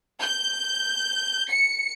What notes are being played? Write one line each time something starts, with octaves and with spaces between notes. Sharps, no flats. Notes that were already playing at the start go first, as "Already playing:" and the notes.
G6
C#7